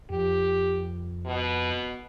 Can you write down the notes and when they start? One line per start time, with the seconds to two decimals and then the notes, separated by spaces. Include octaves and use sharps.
0.10 F2 G4
1.26 B2